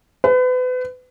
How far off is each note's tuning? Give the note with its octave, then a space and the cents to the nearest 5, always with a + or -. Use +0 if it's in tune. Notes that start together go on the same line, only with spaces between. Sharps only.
B4 +35